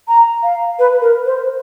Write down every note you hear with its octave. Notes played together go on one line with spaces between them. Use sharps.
A#5
F5
B4
A#4
C5